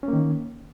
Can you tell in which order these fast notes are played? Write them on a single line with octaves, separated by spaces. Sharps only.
C#4 A#3 D#3